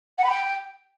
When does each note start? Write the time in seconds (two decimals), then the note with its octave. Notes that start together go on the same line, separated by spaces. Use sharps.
0.18 F#5
0.23 B5
0.29 G5